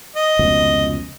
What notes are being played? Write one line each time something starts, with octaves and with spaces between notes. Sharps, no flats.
D#5
F1 C#2 B2